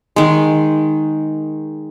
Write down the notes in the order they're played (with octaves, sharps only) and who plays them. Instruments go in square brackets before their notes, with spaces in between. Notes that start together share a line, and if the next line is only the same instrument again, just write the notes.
[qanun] D#3 G#3